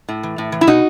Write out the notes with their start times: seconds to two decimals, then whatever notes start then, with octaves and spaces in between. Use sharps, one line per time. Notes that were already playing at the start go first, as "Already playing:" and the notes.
0.09 A2
0.23 E3
0.38 A2
0.52 E3
0.61 E4
0.67 B2 D#4 F#4